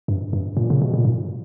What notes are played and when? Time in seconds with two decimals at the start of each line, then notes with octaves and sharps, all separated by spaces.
0.08 G2
0.33 G2
0.57 A#2
0.70 C#3
0.82 B2
0.94 A#2
1.05 G#2